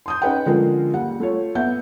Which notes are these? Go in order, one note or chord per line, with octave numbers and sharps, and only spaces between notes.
C6 D#6 G6
C#4 D#4 G#4 B4 F#5 G5
D3 F3 G#3 C#4 F4 A#4
D#2 G3 F#5
A3 F4 C#5
B3 E5 F#5 G6